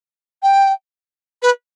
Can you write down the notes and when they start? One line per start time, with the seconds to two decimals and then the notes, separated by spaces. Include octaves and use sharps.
0.42 G5
1.42 B4